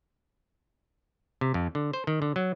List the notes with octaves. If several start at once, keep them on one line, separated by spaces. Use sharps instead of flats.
C3
F2
D3
C5
D#3
D3
F#3